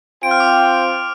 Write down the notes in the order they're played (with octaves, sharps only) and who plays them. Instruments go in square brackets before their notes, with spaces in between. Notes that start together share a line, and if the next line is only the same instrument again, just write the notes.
[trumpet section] C4 F4 C5 G5 [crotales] D7
[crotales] F6
D6
F6